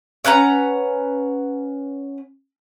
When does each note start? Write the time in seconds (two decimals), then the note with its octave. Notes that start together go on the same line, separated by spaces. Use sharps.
0.25 C#4 B4 F#5 A#5